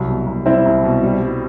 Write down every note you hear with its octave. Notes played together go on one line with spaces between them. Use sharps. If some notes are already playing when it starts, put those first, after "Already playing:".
Already playing: C2 F#3
B2
C2
G3 C4 E4
C2
B2
G3
G3